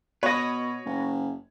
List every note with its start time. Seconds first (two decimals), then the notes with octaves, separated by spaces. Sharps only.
0.23 B2 B4 C#5 D#5
0.85 F#1